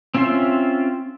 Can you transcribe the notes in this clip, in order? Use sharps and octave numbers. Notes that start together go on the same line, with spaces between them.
C4 C#4 F4 E5 C6